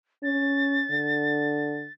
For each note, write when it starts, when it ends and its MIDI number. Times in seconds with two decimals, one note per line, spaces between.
0.23 0.85 61
0.23 1.92 93
0.91 1.86 50